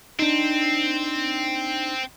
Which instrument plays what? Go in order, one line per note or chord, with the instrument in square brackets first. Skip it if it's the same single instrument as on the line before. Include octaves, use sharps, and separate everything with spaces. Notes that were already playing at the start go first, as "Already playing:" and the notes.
[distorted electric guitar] C4 [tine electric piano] D4 D#4